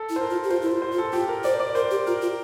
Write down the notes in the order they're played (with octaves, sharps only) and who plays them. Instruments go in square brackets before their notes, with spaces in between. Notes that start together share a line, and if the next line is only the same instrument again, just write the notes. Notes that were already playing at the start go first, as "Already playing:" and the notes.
Already playing: [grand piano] A4
[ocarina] E4
[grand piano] C5
A#4
[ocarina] F4
G4
[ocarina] F4 [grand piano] C5
[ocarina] E4 [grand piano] C5
[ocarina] F4
[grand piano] C5
[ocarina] F4
[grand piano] A4
[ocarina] F4 [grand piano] G4
[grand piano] A#4
[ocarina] C5 [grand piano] D5
[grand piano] D5
[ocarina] A#4 [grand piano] C5
[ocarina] G4
[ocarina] F4 [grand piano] A#4
[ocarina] F4